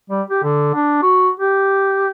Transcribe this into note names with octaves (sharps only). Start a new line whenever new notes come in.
G3
G4
D3
D4
F#4
G4